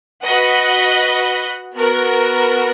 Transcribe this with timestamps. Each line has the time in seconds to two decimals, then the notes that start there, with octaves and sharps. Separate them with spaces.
0.23 F#4 B4 D#5 F#5
1.74 B3 F#4 A#4